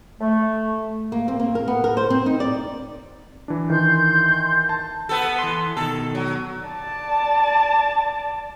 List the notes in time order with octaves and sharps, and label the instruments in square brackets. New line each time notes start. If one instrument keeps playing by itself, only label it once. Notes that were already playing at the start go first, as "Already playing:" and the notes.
[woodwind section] A3
[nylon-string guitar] A#3
C4
A#3
A#4
B3
A#4
C5
C4
D#4
D5
[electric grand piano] E3 D4
[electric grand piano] D#3 E3 [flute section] C6 G6
[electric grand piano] A5
[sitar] B3 A4
[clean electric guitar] E3 C6
[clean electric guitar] B2 D#3 [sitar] A4
[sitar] F#3
[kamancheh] D5 A5